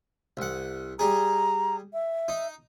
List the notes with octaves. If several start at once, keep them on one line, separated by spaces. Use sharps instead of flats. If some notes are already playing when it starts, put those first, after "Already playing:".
C2 F#5
G3 G#4 A#5
E5
D#4